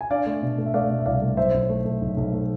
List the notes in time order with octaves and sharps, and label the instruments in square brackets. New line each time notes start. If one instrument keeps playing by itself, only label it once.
[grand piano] G#5
D4 D5 F5
A3
B2
A3
E5
A3 D5 F5
B2
E5
C2 D5 F5
A3
B1 C5 E5
B1
A3
A3
B1
B1
A3